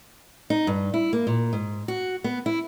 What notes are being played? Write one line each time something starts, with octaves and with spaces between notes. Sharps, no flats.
D#4
G2
E4
A#3
A#2
G#2
F#4
B3
E4